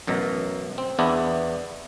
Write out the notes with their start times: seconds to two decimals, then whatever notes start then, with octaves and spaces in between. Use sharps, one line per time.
0.07 A1 F#2 B2 A#5
0.78 C4
0.99 E2 B3 D4 E4